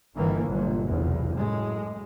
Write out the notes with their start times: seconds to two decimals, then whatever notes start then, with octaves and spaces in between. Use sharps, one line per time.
0.15 G1 D#3 E3 A#3
0.48 G1 A#2 F#3
0.88 F1 B1 E2
1.36 F#2 A2 G#3